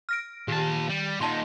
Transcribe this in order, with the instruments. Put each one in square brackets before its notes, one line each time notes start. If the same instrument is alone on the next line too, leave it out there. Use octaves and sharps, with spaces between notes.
[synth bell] F6 A#6 D7
[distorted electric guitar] A#2 A5 [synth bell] D#3 G4
[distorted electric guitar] G3
[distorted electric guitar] A#2 D#4 [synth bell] D#5 A5 C6